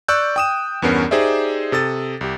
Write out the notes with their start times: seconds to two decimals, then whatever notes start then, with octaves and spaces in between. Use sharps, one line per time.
0.08 D5 C#6 E6 F#6 G6
0.36 G5 D#6 E7
0.82 E2 G2 B3 C#4 A#4 C7
1.11 D#4 G4 G#4 C5 D5 E5
1.72 C3 A4 D#6 A6
2.21 C2 G4